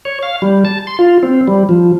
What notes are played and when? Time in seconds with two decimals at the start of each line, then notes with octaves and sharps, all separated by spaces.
0.05 C#5
0.23 F5
0.42 G3
0.65 A5
0.87 C6
0.99 F4
1.23 C4
1.48 G3
1.69 F3